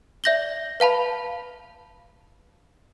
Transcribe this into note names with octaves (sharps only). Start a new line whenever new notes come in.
D5 E5 G6 A#6 F#7 G7
B4 F5 A5 B5